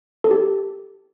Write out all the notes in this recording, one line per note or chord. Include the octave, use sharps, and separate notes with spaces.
A4
G4